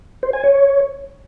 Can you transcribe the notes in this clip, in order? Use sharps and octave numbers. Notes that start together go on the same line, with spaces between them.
C5
G#5
C#5